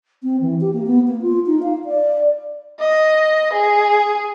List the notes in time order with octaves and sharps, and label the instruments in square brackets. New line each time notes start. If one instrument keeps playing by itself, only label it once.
[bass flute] C4
E3
G4
A#3
B3
A#3
F4
D#4
F5
D5
[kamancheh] D#5
G#4